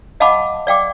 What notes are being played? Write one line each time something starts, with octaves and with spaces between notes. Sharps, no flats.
D#5 F5 F#5 A5 B5 D6
D5 F5 G5 D6